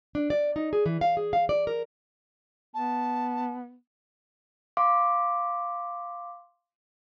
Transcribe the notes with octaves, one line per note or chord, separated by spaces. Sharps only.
D4
D5
D#4
G#4
E3
F5
G#4
F5
D5
A#4
B3 A5
F5 C6 D6